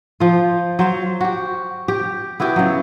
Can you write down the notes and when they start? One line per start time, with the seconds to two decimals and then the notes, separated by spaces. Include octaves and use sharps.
0.20 F3 F4
0.79 F#3 C5 F5
1.21 F#4 G4
1.88 G4
2.40 B3 E4 F#4 G4
2.56 C#3 F#3